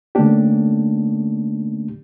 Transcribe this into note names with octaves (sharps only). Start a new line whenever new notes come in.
D3 A3 A#3 C#4 D4 G4